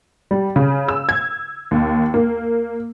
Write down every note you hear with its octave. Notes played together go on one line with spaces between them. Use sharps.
G3
C#3
E6
G#6
D#2
A#3